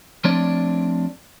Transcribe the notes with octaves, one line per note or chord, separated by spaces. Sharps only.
F3 A3 C4 D4 C#5 D5